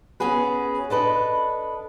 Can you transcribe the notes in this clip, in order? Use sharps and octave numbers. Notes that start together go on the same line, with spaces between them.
B3 C#4 F#4 G#4 B4
D4 A4 B4 D#5